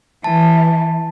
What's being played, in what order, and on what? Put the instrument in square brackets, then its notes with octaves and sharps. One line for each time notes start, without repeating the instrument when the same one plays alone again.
[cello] E3 [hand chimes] A5